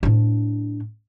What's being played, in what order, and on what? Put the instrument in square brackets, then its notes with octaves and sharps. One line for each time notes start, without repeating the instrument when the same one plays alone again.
[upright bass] A2 D4